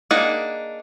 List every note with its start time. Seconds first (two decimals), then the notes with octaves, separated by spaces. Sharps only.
0.11 A#3 D4 D#4 G#4 F#5